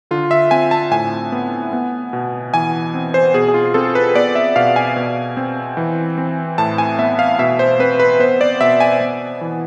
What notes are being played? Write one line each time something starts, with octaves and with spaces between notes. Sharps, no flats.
D3 F4
E5
C4 G#5
A5
A2 G#5
B3
B3
B2
E3 G#5
C4
C5
B2 G#4
G#4
F4
C4 A4
B4
B3 D5
E5
B2 F5
G#5
B2
C4
E3
C4
A2 A5
G#5
B3 E5
F5
B2 E5
C5
C4 B4
B4
B3 C5
D5
B2 E5
G#5
B3
E3